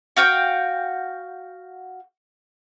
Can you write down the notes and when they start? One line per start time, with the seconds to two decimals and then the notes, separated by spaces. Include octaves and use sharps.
0.17 F#4 F5 G5